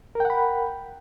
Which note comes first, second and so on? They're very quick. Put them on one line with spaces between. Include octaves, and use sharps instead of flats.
A#4 G5 F#5 B5